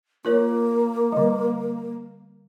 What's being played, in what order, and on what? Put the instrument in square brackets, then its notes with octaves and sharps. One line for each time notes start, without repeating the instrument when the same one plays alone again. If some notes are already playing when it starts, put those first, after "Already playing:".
[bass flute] A#3 [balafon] F4 A#4 C#5
[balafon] D3 G3